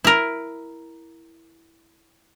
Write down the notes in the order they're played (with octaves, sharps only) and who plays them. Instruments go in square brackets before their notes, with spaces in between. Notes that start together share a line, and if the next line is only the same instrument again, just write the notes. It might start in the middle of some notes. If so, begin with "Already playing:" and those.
[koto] E4 A#4